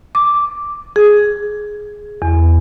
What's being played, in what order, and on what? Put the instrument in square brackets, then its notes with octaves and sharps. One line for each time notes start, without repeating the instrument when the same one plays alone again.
[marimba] D6
G#4
E2